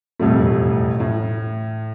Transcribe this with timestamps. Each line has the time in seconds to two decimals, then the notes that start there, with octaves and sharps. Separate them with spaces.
0.19 E1 F2 A2 G3 A3
1.00 A2